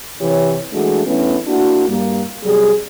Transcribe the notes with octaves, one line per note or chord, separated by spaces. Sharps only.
C3 E3 G4 C#5
E3 G#3 A3 D4 F#4 G#4
E3 A3 B3 C#4 D4 E4
A#3 D4 E4 F#4
G2 G3 A#3
C3 F#3 G3 G#4